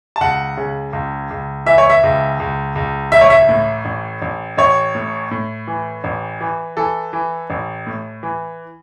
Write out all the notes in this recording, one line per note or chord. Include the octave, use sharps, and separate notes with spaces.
A5
C#2 F#5
C#3
C#2
C#2
E3 E5
C#5
E5
C#2
C#2
C#2
A1 E5
C#5
E5
A2
A1
A1
A1 C#5
A2
A2
E3
A1
E3
E3 A4
E3
A1
A2
E3